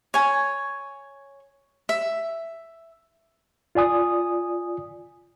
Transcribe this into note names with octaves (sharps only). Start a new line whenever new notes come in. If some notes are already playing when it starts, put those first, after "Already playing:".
C#5 G#5
E5
F4 D5 G#5 D#6